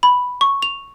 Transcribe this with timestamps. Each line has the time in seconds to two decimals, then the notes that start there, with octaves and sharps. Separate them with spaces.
0.03 B5
0.41 C#6
0.62 F7